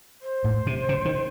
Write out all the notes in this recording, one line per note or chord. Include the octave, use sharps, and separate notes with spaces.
C5
A2
C3
C#3
D#3